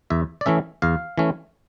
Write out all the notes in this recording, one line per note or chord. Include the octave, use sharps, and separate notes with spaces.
E2 E5
D5
E3 A3 C#4 E5
E2 F5
E3 A3 C#4